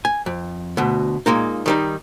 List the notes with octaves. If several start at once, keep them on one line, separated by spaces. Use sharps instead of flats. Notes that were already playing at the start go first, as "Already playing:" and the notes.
G#5
F2
D2 B2
A#2 G#3 A#3 D#4
D#3 G3 D#4